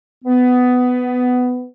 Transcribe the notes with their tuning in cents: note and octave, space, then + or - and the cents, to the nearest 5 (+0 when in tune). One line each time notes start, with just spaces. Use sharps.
B3 +15